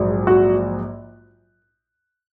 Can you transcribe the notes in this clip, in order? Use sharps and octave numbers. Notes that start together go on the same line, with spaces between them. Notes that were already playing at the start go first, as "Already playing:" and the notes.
Already playing: A#1 G#2 F#3
F#4